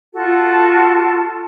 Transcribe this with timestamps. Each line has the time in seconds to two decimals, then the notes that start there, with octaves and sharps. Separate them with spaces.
0.13 F4 F#4 A4 A5